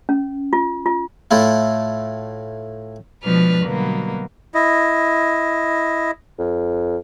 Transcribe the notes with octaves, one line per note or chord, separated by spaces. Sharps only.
C#4
F4
F4
A2 A3 E4 F4
B2 F3 G#3 D4 B4 F6
B2 D3 F#3 G3 A#3 B3
E4 D#5
F2